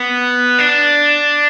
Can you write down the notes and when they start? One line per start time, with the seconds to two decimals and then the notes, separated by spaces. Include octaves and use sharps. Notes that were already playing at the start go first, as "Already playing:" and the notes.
Already playing: B3
0.59 D4